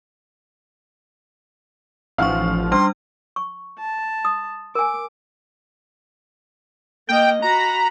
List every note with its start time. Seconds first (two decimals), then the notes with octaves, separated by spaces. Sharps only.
2.18 A1 F3 C#4 D#4 F5 F#5 C#6 F6
2.72 G3 D4 C6 F6
3.36 C#6
3.79 A5
4.25 D#6
4.75 A#4 G#5 D6
7.09 A#3 D#5 G5
7.42 F#4 A#5 B5